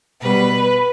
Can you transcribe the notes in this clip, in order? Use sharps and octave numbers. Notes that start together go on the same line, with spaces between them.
B2 G3 B3 B4